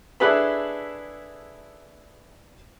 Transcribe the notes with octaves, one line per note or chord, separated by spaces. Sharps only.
D4 E4 G#4 A4 B4 B5